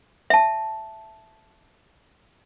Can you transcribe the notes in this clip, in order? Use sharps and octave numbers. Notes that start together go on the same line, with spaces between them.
E5 A5